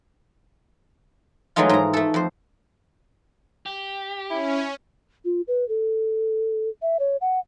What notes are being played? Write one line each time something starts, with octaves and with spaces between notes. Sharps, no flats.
E3 F#3 G#3 A3 D#4 F4
G#2 A#5
A3 A4
F2 C5
G4
C#4 E4
F4
B4
A4
E5
C#5
F#5